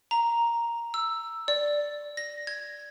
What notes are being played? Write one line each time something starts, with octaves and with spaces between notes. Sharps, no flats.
A#5
E6
D5
A#6
G#6